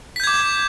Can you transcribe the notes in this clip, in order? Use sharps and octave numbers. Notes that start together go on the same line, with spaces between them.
D6 G6 G#6 B6